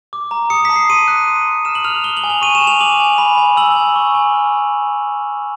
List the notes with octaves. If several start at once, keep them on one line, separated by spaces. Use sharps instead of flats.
D6
A#5
D#6 C#7
A5 B6
C7
C6 D#7
F#6
C6
C6
F6 E7
F#7
F6 F7
F#7
F6 G7
F#7
G#5
F7
C#6 D#7
E7
G#5
F7
D6 F#7
G#5
B5
G#5
E6 F#7
G#5
C#6
G#5
F6
B5